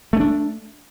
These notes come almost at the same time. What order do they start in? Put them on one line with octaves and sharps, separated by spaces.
A3 C#4 D4